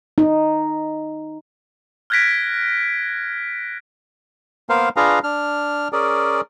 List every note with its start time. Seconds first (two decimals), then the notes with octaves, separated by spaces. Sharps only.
0.18 D#4
2.10 F6 F#6 G#6 A#6 B6 D7
4.69 A#3 B3 A#4 C5 F5
4.96 D4 F4 G#4 B4 F5 A#5
5.24 D4 F6
5.93 C#4 G#4 A#4 D5